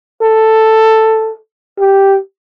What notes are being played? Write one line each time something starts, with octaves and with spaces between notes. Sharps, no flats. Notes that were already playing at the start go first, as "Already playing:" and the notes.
A4
G4